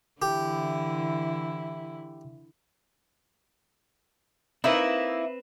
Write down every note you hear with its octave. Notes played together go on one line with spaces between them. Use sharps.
D3 E3 E4 G4
A#3 C4 D#4 E4 B4 E5